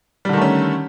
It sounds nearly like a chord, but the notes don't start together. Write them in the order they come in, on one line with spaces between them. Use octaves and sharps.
G3 D3 D#3 A3 C#4